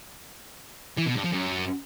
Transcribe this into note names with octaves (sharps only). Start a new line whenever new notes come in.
E3
B2
G2
F3
F#2